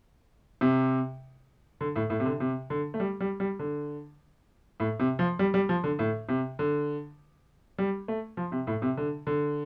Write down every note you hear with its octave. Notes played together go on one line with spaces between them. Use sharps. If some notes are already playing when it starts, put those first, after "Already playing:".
C3
D3
A2
A2
C3
D3
C3
D3
A3
G3
G3
G3
D3
A2
C3
F3
G3
G3
F3
D3
A2
C3
D3
G3
A3
F3
C3
A2
C3
D3
D3